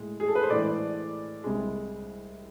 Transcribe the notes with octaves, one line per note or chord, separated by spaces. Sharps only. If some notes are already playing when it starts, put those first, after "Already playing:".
Already playing: A2 G#3
G#4
A4
B4
C5
A2 E3 G#3 D5
C2 C3 G#3